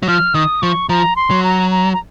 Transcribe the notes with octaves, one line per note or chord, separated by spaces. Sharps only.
F#3
F3 F6
D#3 D#6
F3 C#6
F3 A#5
C6
F#3
A#5
A#5
A#5